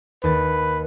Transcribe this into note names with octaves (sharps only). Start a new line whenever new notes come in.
D#2 B4 A6